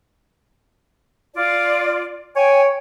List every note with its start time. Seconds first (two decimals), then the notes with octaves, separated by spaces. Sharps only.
1.35 F4 D5
2.36 C#5 G5 G#5